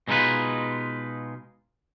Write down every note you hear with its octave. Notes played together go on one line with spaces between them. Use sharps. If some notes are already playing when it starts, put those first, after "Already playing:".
B2 G#3 D#4 F4 B4